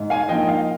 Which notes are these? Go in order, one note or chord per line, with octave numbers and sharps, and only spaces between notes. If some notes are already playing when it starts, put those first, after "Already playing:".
Already playing: G#2
F5 G#5
F3 A#3 D#4 D#5 G5
F5